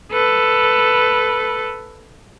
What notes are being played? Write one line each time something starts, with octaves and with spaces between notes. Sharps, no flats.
A4 B4